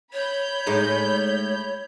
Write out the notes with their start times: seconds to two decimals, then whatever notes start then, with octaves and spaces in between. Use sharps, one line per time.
0.13 C#5 B5 G6
0.66 A2 G#3 D#4